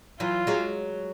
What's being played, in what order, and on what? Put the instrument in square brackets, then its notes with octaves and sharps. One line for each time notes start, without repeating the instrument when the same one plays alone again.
[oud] E3 F#3 [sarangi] F4
[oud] F#3 G#3